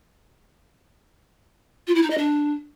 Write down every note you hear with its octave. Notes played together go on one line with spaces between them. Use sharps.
F4
E4
D#4
D#5
D4